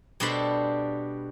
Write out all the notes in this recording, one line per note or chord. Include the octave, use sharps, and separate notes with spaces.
B2 G3 D4 A4 C5 B5